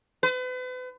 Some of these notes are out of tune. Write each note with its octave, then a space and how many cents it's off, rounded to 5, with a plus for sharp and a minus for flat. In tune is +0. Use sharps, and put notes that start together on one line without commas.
B4 +40